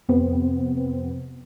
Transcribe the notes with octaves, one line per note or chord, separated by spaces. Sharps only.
F2 C3 B3 C4